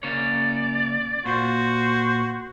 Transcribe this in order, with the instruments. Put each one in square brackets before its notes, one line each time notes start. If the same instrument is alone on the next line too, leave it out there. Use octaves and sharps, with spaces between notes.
[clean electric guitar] C#3 A#3 C#5 [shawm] D5
[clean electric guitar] A#2 [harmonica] F#4 [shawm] C5